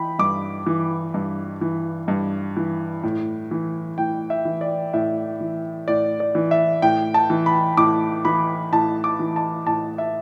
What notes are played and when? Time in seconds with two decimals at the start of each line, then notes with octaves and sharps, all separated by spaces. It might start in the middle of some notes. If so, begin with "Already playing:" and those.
Already playing: E3 G5 B5
0.19 G2 D6
0.66 E3
1.14 G2
1.61 E3
2.08 G2
2.57 E3
3.03 A2
3.51 E3
3.98 A2 G5
4.30 E5
4.45 E3
4.61 D5
4.94 A2 E5
5.41 E3
5.88 A2 D5
6.20 D5
6.35 E3
6.51 E5
6.82 A2 G5
7.14 A5
7.30 E3
7.46 B5
7.77 A2 D6
8.25 E3 B5
8.72 A2 A5
9.04 D6
9.20 E3
9.36 A5
9.67 A2 A5
9.98 E5